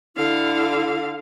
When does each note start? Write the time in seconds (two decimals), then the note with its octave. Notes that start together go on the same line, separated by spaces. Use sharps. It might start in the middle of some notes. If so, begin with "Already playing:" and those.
0.17 D3 E4 F5